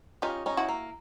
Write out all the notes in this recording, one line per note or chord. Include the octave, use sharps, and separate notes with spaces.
C#4 D#4 F4 G4
C#4 D#4
E4 F#4
A#3